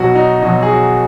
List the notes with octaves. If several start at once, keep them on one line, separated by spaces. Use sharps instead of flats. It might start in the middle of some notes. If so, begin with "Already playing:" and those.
Already playing: B1 B2 F#3 F#4
D#4
B1 B2 F#3 D#4
G#4
F#4